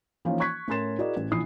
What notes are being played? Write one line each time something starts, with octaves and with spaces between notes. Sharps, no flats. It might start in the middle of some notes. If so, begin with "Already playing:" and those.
E3 F3 A#3 C#4 D#4 F4
C#6 F#6 G#6 B6
A2 C#4 A#4 C6 A6 E7
E4 F#4 G#4 A#4 D5 D#5
A1
A#1 E3 E4 D#6 C7